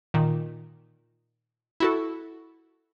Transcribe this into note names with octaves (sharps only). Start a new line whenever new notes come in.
A#2 D#3
E4 F#4 A4